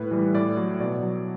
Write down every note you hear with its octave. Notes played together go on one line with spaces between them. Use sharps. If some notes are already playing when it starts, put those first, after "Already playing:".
Already playing: A2 B4
E3 G3
A2 D5
F#3
B2 D5
F#3